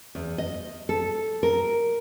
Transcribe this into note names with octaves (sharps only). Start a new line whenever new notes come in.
E2
D#5
A4
A#4